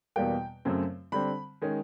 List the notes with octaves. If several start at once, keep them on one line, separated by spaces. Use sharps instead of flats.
E2 B2 G3 A#3 G5
F#2 C#3 F#3 A3 C4
D3 G3 C4 B5
D#3 G#3 C#4